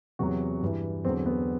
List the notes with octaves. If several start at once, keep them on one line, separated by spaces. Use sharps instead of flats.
E2 C3 F#3 F#4
G2 E3
E2 D3 F#3 C4
B3